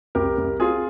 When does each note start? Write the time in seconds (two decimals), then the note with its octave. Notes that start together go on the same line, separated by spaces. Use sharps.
0.15 C2 G4 A#4
0.38 C2
0.60 C4 F4 G#4